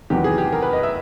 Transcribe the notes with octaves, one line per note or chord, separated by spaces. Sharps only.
E2 C3 D#3 F#3 B3 G4
G#4
G4
A#4
B4
D#5
E5